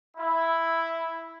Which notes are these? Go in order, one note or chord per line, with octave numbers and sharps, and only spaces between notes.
E4